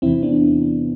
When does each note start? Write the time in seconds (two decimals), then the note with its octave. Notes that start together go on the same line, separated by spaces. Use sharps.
0.02 E2 C3 E3 C4 E4
0.23 B3 D4